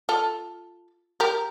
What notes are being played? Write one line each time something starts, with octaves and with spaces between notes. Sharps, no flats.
F4 A4
G4 A#4